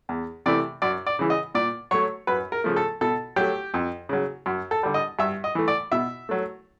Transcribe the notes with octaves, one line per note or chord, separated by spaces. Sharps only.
E2
C3 E3 A3 D5
F#2 D5
D5
C#3 E3
D#5
A#2 D5
F#3 A3 C#5
F#2 B4
A#4
C#3 F3 A3
A4
B2 A4
F#3 A3 G4
F2
C#3 F#3
F#2
A4
D3 G3
D#5
G2 E5
D#5
E3 A3
D5
B2 E5
F#3 A3